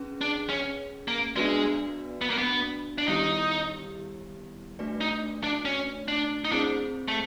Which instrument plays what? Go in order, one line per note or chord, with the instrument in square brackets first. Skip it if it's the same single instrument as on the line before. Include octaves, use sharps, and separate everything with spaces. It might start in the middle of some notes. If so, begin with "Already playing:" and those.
Already playing: [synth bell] C#4 G#4 B4
[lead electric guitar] D4
C#4
A#3
[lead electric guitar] G#3 [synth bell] B3 D4 F#4 B4 D5
[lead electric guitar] B3
A#3
B3
D4
[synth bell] D#3 G3 B3 E4 G4 [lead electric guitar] D#4
[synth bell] A3 D4 F#4 B4 D5
[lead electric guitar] D#4
D4
C#4
D4
D#4
[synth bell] C4 E4 G#4 C5 [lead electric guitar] D4
[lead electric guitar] A3